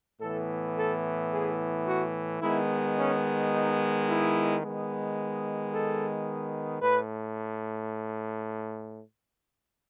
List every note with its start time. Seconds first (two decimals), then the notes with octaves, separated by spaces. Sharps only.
0.20 A2 E3 B3 A4
0.76 A4
1.31 G#4
1.86 F#4
2.41 D#3 G#3 B3 E4
2.96 C#4
3.51 D#4
4.06 E4
4.61 D#3 G#3 B3
5.72 A4
6.81 A2 B4